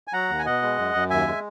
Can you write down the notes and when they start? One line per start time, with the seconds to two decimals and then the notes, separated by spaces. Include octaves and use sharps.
0.08 G#5
0.13 F#3 F#5 A#5
0.29 D#2
0.39 G#5
0.46 B2 D#5 F#5
0.62 G#3
0.78 F#2
0.95 F#2
1.10 D#2 E5 G#5
1.27 G#3